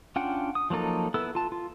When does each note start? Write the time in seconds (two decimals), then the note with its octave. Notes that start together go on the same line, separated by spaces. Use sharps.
0.16 C#4 D4 F4 F#5 G5
0.55 D#6
0.70 F3 F#3 A#3 D#4 A4
1.14 B3 E4 A4 E6
1.35 F4 A5
1.52 F4